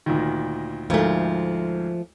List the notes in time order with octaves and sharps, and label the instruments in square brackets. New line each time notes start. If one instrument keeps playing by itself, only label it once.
[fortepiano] D2 A#2 D#3
[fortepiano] D2 G#2 A#4 [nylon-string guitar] F3 A3